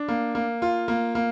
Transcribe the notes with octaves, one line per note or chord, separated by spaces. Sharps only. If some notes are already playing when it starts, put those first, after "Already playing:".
Already playing: D4
A#3
A#3
F4
A#3
A#3